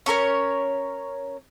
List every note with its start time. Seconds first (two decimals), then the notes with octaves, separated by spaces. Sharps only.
0.06 C#4 A4 A#4 C#5